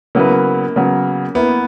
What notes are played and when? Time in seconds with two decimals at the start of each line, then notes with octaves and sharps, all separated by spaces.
0.15 C#3 F#3 A#3 B3 E4 B4
0.76 C#3 F#3 B3
1.35 A#3 B3 E4 B4